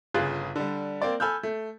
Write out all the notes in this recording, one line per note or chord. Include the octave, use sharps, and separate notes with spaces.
G1 C#3 F4 G#4 F#6 A6
D3 G3
A#3 C4 D5
A4 G#5 B5 E6 F6 G6
A3